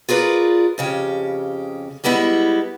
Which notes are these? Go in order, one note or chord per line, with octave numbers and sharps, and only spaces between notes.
F4 G#4 A#4 B4 D5
F2 C#3 G4
G3 G#3 B3 E4 E5